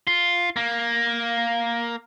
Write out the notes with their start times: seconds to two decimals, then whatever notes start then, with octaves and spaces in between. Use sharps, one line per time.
0.07 F4
0.56 A#3